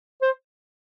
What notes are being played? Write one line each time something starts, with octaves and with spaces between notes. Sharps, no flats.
C5